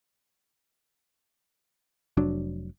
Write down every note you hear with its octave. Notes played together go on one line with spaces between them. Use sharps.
F1 F#3 D4